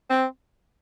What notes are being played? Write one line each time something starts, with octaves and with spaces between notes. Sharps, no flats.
C4